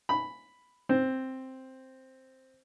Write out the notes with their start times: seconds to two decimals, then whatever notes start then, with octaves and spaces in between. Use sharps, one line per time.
0.09 B5
0.89 C4